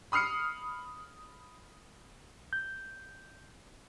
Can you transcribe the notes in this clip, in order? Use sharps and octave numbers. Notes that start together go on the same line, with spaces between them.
B5 D#6 F6 C7 C#7
G6